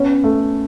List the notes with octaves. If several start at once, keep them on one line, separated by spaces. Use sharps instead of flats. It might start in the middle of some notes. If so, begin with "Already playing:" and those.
Already playing: B3 C#4
A3